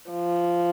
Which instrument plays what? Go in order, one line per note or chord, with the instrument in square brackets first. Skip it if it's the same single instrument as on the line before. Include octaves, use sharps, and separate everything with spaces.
[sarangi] F3